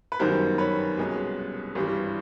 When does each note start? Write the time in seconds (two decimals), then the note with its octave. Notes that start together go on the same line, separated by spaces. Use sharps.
0.12 B4
0.19 G1 F#2 D#3 G3 B3 A#4 C5
0.58 B4 C#5
0.97 C2 B2 G#3 C#4
1.75 G#1 G2 E3 G3